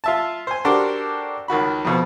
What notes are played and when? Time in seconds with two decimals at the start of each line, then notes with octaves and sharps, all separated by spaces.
0.04 F4 E5 A5
0.47 C5 G#5
0.65 D4 F#4 G4 A4 A#4 C5
1.48 C#2 D#3 F#4 B5
1.85 F2 B2 F3